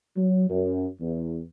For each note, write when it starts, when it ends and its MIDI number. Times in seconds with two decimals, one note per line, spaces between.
0.17 0.47 54
0.49 0.86 42
1.01 1.40 40